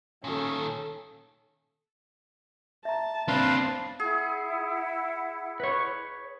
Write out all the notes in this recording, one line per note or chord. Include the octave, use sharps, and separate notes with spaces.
A#2 D#3 C#4 A4
E5 A5 A#5
C4 D4 B4 F5 A5 C6
E4 G#4 F#5
B4 C#5